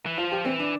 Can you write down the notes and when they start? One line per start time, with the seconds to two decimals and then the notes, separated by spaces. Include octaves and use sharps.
0.06 E3
0.18 F3 F4
0.32 G4
0.45 E3 C4
0.59 D4